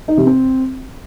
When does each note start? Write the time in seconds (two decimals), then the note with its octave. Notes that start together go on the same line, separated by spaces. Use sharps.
0.08 D#4
0.17 C3
0.26 C4